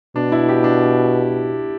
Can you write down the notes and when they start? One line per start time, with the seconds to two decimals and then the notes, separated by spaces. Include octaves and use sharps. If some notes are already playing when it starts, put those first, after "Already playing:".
0.16 B2 D4
0.32 E4
0.48 G4
0.64 D4